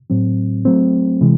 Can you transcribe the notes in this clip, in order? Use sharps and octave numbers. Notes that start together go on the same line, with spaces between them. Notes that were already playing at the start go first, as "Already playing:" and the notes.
A2 F#3 C4
F#3 A3 C4
C3 E3 G#3